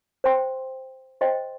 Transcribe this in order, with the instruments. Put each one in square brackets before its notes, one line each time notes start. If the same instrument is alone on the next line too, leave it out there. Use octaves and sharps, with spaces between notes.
[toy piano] C5 G5 C6
C5 D#5 G5 C6